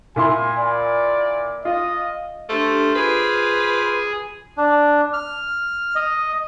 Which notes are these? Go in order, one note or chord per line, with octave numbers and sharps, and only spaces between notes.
A#2 E4 G#5 C6
D5
F4 D#5
A3 D4 G4 A4 C5 D6 F6
F4 G#4 B4
D4
F6
D#5